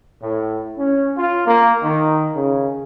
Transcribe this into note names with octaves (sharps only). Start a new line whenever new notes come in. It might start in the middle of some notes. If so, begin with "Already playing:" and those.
A2
C#4
F4
A#3
D#3
C#3